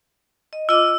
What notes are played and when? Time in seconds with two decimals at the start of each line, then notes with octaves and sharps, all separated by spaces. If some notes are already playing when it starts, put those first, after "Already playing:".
0.53 D#5
0.69 F4 D#5 D6 E6